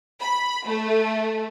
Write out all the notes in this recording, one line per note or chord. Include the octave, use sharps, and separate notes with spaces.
B5
A3